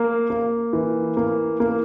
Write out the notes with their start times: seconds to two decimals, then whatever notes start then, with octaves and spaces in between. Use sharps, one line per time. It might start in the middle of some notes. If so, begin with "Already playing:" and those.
Already playing: A#3
0.30 A#3
0.73 E3
1.17 A#3
1.60 A#3